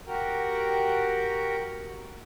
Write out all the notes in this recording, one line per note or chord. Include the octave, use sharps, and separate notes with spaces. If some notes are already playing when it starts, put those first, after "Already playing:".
F#4 G4 A#4